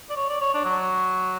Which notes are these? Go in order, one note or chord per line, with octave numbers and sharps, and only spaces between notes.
D5
C#5
D5
C#5
D4
F#3